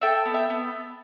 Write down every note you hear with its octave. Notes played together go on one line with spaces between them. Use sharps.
A4 E5 G5
B3
E5 G5
B3